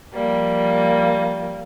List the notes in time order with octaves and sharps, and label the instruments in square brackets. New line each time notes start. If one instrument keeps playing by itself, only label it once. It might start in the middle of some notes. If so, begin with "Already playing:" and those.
[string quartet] F3 G3 A#3